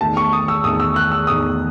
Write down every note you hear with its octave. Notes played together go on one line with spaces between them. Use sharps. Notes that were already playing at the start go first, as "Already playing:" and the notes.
E2 D#3 A3 A5
C#6
D#6
E6
E2 D#3 A3 D#6
E6
F#6
E6
E2 D#3 A3 D#6